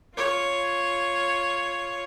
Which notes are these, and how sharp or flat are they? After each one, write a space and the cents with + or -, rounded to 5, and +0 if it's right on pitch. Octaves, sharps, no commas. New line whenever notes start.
F4 +0 C#5 +0